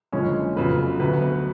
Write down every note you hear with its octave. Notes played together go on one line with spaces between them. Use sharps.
F#1 F2 D3 G#3 C#4 C#5
F1 F2 C#3 F#3 B3 B4
D2 D3 F#3 B3 B4
B3 B4